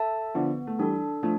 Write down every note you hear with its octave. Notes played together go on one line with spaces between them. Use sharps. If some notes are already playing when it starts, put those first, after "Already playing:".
Already playing: A4 E5 A5
D3 F3 B3
A3
E3 G3 D4 A4
F3 A3 D4